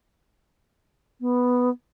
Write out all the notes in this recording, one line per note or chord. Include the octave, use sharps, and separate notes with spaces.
B3